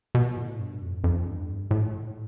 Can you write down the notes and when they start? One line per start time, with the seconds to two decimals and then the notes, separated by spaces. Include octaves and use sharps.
0.15 B2
0.36 A2
0.59 G2
0.82 F2
1.04 F2
1.26 G2
1.71 A2